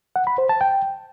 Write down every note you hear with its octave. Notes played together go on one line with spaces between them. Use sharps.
F#5
B5
C5
A5
G5